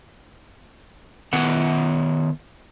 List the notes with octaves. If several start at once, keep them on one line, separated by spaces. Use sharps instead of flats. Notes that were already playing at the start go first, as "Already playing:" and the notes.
D#3 B3 C5 F#5